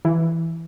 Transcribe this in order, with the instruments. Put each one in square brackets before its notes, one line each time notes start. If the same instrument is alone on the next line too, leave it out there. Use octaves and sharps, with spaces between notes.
[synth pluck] E3